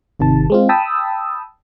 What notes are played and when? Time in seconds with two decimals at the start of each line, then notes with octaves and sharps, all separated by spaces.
0.19 G#1 C3 D#3 A5
0.50 G#3 C4 F4
0.69 G5 A5 B5 D#6 E6